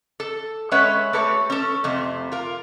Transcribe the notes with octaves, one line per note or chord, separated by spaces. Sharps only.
A4
G#3 C#4 B4 C#5 E5 F#5
A3 G4 A4 B4 C#5
C#4 A4
F2 C3 A3
F4 A#4